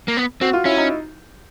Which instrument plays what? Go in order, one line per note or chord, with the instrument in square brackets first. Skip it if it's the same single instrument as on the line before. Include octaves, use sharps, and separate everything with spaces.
[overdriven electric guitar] A#3
B3
[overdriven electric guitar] C4 [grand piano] F#4
[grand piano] F4
[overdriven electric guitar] C#4 [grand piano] E4
[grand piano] D#4